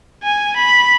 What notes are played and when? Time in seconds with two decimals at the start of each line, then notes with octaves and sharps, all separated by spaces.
0.23 G#5
0.56 B5